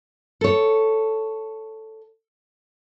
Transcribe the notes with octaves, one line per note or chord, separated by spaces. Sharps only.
A4 C#5